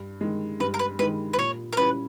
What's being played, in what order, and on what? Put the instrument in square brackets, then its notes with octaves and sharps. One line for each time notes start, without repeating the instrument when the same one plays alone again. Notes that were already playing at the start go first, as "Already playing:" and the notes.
Already playing: [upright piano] G2
D#3 G#3
[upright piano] G2 [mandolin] B4
[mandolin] A#4
B4
[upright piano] G#3 [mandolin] B4
[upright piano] D#3
[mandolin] B4
[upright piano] A#2 [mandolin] C#5
[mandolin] A#4
[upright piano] G3 C#4 E4 [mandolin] B4